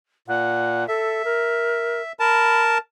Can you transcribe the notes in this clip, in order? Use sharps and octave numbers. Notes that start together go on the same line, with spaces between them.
A#2 F#5
A4 E5
A#4
A#4 A5 B5